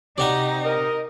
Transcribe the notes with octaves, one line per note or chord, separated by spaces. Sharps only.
C3 D#4 F#4 G4 D5
A#4 D#5